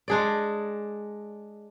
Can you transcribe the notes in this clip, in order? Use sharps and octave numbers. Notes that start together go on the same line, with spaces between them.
G#3 D4 G#4 D5